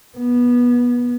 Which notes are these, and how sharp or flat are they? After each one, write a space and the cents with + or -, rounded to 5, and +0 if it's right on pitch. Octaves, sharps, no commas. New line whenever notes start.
B3 -20